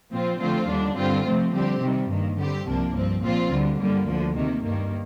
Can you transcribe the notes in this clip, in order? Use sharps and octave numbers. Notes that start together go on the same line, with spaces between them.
A#2 F3 C4 F4
D3 F3 A3 C4 F4
D#2 D3 G3 D4
G2 D3 G3 C4 F4
C3 F3 A3 C4
D3 G3 C4 G4
C3 D#3 G3
G2 D#3 A#3
D3 G3 C4 G4
C2 C3 F3 A#3 D4
G2 F3 C4
A#2 F3 C4 F4
D2 D3 G3
G2 D3 G3 A#3
D2 D3 F3
C3 D#3 A#3
G2 D#3 A#3